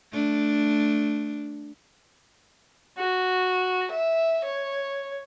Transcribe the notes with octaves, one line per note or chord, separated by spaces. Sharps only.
A3 D4
F#4
E5
C#5